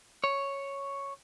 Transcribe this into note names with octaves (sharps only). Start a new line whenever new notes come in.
C#5